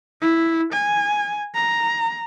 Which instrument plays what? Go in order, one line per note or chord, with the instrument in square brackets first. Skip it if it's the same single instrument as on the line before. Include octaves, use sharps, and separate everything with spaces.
[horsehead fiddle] E4
G#5
A#5